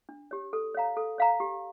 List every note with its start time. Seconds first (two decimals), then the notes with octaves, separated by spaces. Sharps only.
0.09 D4
0.31 G4 C#5
0.53 A4
0.75 C#5 F5 A#5
0.97 A4
1.18 C#5 F5 A#5
1.40 G4